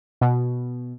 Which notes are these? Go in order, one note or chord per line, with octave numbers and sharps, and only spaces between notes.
B2